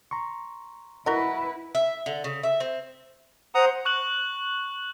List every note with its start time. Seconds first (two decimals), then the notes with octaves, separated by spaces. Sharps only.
0.11 A#5 C6 C#6
1.06 E4 F#4 A#4 B4 D#5 F#5 A#5
1.75 E5
2.06 D3
2.24 C#3
2.43 E5
2.60 C4
3.55 C5 F#5 A#5 D#6
3.85 C#6 F#6 F#7